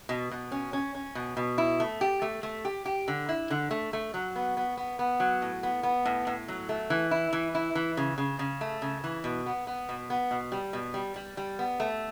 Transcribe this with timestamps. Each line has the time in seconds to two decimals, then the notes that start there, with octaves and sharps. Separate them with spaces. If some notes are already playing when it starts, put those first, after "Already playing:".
0.09 B2
0.31 B2
0.52 C#4
0.73 C#4
0.95 C#4
1.15 B2
1.37 B2
1.58 E4
1.80 A3
2.01 G4
2.22 A3
2.43 A3
2.65 G4
2.86 G4
3.08 D3
3.29 E4
3.50 D3
3.71 A3
3.93 A3
4.14 F#3
4.36 B3
4.57 B3
4.77 B3
4.99 B3
5.20 F#3
5.42 A2
5.63 B3
5.83 B3
6.05 A2
6.27 A2
6.48 F#3
6.69 A3
6.90 E3
7.11 E4
7.33 E3
7.55 E4
7.75 E3
7.97 C#3
8.18 C#3
8.39 C#3
8.61 A3
8.82 C#3
9.04 E3
9.24 B2
9.46 B3
9.67 B3
9.89 B2
10.10 B3
10.31 B2
10.52 G3
10.73 B2
10.94 G3
11.16 G3
11.37 G3
11.59 B3
11.80 A3